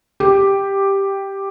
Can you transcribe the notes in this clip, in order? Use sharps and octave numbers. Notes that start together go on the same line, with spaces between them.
G4